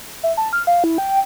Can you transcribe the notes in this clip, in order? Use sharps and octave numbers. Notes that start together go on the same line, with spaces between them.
E5
A5
F6
F5
E4
G5